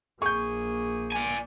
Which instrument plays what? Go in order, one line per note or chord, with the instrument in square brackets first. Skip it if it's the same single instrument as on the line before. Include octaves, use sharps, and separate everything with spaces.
[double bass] A#1 A#3 [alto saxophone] G#4 [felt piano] C#6 G6
[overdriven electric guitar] D5 G#5